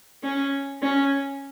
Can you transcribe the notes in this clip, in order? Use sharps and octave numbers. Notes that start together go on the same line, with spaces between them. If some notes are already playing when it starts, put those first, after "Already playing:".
C#4
C#4